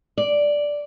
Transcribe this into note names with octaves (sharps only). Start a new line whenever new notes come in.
D5